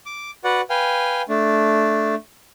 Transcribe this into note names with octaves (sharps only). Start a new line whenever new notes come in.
D6
F#4 B4 D5 F#5
B4 F5 G5 G#5
A3 D4